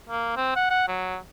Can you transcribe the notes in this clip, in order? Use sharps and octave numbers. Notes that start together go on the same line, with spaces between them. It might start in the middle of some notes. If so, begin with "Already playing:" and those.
A#3
C4
F#5
F#5
F#3